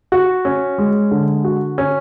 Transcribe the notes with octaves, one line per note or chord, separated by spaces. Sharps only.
F#4
C#4
G#3
D3
F#4
C#4